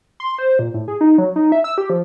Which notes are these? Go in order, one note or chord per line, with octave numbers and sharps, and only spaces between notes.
C6
C5
A#2
A2
G#4
D#4
F#3
D#4
E5
E6
G4
F3